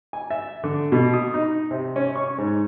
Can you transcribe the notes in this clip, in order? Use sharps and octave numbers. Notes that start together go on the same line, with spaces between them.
G#5
E5
D3
B2
D#6
D#4
C3
C#4
C#6
G#2